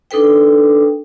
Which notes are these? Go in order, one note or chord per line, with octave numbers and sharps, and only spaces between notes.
D4 D#4 A4 B4 G5